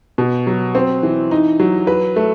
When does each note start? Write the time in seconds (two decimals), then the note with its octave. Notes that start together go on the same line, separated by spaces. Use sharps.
0.18 B2
0.47 F#3
0.75 C4
1.03 E3
1.31 D#4
1.60 F#3
1.87 B4
2.16 A3